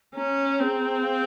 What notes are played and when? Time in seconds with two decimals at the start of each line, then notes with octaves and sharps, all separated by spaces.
0.15 C#4 A#5
0.59 C4 G#4
1.03 F5